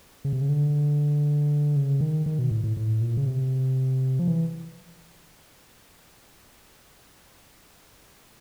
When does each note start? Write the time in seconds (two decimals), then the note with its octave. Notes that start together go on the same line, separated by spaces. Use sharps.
0.25 C#3
0.33 C3
0.41 C#3
0.49 D3
1.76 C#3
2.01 D#3
2.26 D#3
2.39 B2
2.51 A2
2.64 A2
2.77 A2
3.01 A#2
3.17 C#3
3.26 C3
4.19 F3
4.27 E3